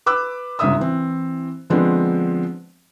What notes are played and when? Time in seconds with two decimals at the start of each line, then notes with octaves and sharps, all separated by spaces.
0.06 B4 D6 E6 F#6
0.59 G1 G#2 C#3 E5 D#6 E6
0.80 E3 C4
1.70 D3 F3 G#3 B3 C4 D4